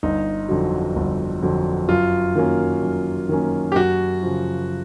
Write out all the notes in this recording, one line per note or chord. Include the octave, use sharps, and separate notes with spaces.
G1 D#4
F2 D3 F#3
G1
F2 D3 F#3
F#2 F4
D#3 F#3 A#3 C#4
F#2
D#3 F#3 A#3 C#4
G4
F#2 F#4
C#3 F3